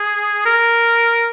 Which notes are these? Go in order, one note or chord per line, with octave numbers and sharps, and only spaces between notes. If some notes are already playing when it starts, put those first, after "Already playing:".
Already playing: G#4
A#4